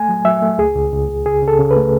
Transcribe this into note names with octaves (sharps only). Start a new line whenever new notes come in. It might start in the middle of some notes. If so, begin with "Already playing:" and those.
Already playing: A3 G#5
F#3
F#3 E5
A3
C#2 G#4
C#2
C#2
C#2
C#3 G#4
C#3
A4
C#3
B4
A3